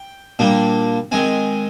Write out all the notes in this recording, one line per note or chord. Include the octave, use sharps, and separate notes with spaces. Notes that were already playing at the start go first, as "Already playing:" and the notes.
Already playing: G5
A#2 G3 A#3 D4
D#3 G#3 C4 G#5